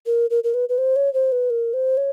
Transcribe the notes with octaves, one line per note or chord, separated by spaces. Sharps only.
A#4
A#4
A#4
B4
B4
C5
C#5
C5
B4
A#4
C5
C#5